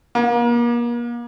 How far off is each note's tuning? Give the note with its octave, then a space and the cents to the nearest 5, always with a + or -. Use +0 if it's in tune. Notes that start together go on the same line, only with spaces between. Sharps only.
A#3 +35